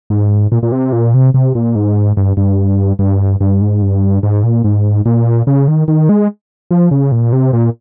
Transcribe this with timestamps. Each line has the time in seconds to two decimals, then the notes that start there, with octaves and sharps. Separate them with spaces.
0.10 G#2
0.52 A#2
0.63 A#2
0.72 C3
0.93 A#2
1.14 C3
1.34 C3
1.55 A#2
1.75 G#2
2.17 G2
2.37 G2
2.99 G2
3.41 G2
3.61 G#2
3.82 G2
4.23 G#2
4.44 A#2
4.64 G#2
5.05 A#2
5.47 C#3
5.68 D#3
5.88 D#3
6.09 G#3
6.71 F3
6.91 C#3
7.12 A#2
7.33 C3
7.53 A#2